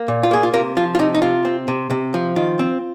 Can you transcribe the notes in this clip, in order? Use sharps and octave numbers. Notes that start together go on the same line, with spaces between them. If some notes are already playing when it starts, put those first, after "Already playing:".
Already playing: A#3
A#2
F4
A#3 G#4
F4
C3 F4 A#4
F3 F4
F4
C3 D#4
D#4
C3 F4
C4
C3
C3
F3
D#3 F4
C4